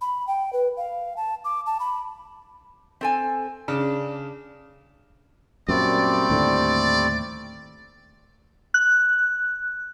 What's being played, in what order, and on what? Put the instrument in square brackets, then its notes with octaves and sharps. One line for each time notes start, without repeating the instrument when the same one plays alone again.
[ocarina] B5
G5
B4
F5
A5
D6
A5
B5
[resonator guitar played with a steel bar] C4 A4 G#5
[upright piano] C#3 [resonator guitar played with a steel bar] D4
[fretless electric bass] F#2 A#2 [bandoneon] G3 A3 C4 [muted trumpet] D5
[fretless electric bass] D#2 A2 D3
[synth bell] F#6